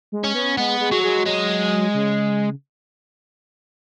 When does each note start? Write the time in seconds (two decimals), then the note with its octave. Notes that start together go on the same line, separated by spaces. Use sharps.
0.12 G#3
0.24 C#4
0.34 B3
0.58 G#3 B3
0.80 G#3
0.92 F#3
1.03 G#3
1.26 F#3 G#3
1.94 C#3